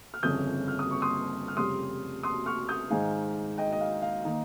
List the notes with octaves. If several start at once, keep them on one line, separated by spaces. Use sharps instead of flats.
F6
G1 F2 C#3 D#6 G6
F6
D#6
C#6
C6 D#6
F6
F1 F2 C#3 G3 C6 D#6
C6 D#6
C#6 F6
D#6 G6
G#2 D#3 G#3 D#4 F5 G#5
D#5 G5
D#5
F5
F5
D#3 A#3 D#4